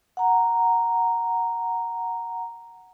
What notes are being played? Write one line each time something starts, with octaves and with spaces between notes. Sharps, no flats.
F#5 A#5